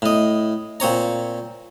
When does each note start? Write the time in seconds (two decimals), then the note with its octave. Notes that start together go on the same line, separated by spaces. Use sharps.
0.02 A2 D#5
0.80 A#2 C4 C#5 A#5